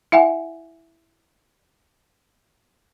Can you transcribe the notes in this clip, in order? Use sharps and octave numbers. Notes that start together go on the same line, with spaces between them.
E4 E5 F#5 G#5